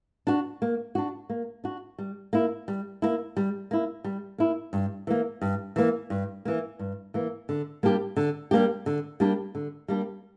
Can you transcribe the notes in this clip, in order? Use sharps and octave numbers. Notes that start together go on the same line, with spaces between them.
D4 F#4
A#3
D4 F#4
A#3
D4 F#4
G3
A#3 E4
G3
A#3 E4
G3
A#3 E4
G3
A#3 E4
G2
E3 A#3
G2
E3 A#3
G2
E3 A#3
G2
E3 A#3
D3
G3 A#3 D4 G4
D3
G3 A#3 D4 G4
D3
G3 A#3 D4 G4
D3
G3 A#3 D4 G4